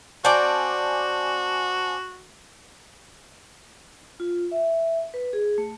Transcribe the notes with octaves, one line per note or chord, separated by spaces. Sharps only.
C4 F#4 D5 G#5 A5 D6
F4
E5
B4
G#4
A3